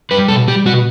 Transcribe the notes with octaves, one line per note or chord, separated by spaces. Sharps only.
G3 B4
B2 A4
G3 G4
B2 F#4